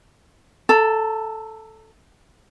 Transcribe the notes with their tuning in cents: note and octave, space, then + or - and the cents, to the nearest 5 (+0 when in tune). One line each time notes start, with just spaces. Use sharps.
A4 +0 A#5 -30